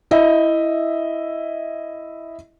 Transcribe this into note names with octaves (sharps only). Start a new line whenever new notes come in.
E4 D#5 E5